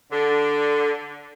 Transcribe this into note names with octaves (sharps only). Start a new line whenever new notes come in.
D3